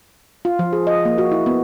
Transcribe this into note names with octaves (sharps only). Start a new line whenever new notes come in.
F4
F3
G#4
D#5
A#3
F#4
E4
B3